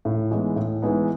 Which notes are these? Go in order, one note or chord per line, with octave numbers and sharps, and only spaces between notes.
A2
E3 G#3 B3 D#4
A2
E3 G#3 B3 D#4